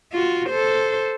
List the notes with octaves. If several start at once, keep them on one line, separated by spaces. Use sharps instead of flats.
F4 F#4
A4 C5